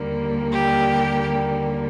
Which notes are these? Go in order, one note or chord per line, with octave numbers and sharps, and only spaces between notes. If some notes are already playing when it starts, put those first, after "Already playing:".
Already playing: D#2 D3 G3 A#3
G4